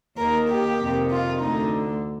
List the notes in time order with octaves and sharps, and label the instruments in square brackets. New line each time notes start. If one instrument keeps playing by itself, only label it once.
[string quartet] D#2 D#3 A#4
G4
F2 C3 D#3
F4
D2 D3 D#4